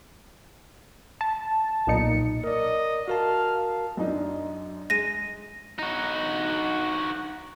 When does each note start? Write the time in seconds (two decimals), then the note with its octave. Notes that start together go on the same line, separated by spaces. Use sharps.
1.21 A5
1.87 B1 A#2 D#4 C#7
2.44 A#4 D5 D#5
3.08 F#4 A#4 F5 A5
3.97 F#2 D4 D#4
4.90 G#3 A#6 D#7
5.79 D#4 F#4